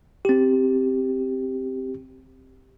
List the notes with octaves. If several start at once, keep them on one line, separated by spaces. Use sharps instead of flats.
C4 G4